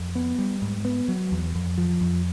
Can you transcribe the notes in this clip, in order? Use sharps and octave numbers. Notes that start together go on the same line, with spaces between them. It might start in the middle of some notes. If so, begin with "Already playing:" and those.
Already playing: F2
B3
G3
G#2
B3
F#3
E2
F2
F3
F2